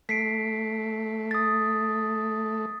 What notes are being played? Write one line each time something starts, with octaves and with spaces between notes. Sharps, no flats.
A3 B6 C7 D7
D#6 A6